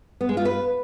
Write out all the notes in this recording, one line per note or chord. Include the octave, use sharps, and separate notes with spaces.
B3
G#3
F4
B4